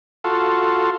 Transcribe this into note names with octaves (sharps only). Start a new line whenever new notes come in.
F4 F#4 A4